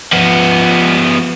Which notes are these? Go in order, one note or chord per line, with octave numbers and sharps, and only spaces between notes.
F3 B3